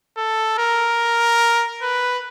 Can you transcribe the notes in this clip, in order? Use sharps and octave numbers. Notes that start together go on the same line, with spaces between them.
A4
A#4
B4